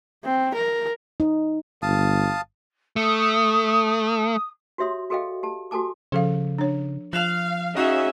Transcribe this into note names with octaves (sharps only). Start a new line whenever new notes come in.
C4
A#4
D#4
G1 F5 A5 D#6
A3 D#6
F#4 G4 C#5 E5 C6 D#6
F#4 G#4 A4 D#5 F5 G5
G4 A5
F#4 G4 A4 G#5 A5 D6
C#3 F3 A4 F5
D4 C#5
F3 F5 F#6 E7 F7
C#4 D#4 F#4 G#4 E5 F5